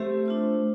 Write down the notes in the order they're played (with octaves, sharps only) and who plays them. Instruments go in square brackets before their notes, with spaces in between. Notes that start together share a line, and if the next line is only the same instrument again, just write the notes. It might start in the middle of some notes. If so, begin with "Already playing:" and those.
Already playing: [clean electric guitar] A3 [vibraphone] C4 G4 C5 E5
[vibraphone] D4 F4 C5